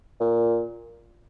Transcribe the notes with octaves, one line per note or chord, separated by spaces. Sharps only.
A#2